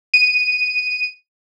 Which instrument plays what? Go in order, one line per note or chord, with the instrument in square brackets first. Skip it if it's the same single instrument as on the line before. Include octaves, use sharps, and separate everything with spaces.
[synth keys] D#7